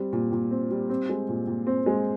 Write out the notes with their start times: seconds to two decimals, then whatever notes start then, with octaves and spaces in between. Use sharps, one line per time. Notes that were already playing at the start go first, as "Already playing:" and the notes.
Already playing: G3 C4
0.13 A#2
0.32 A#2
0.51 C4
0.70 G3
0.89 C4
1.09 G#3
1.29 A#2
1.47 A#2
1.67 C4
1.86 G#3